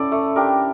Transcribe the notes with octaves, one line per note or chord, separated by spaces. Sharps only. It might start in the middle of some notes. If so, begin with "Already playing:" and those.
Already playing: C#4 E4 A4 D5
A3
D4 G4 A#4